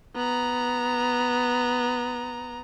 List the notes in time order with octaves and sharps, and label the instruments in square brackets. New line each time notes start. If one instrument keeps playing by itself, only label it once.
[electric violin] B3 A#5